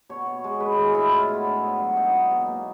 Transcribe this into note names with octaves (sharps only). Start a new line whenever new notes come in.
B2 C#5
B2
G#3
G#3 B4
G#4
A2
F4
G#3 E4
A2 F4
B3 E4
D4
B3
F#3
B2 D#4
B2
B2
A#3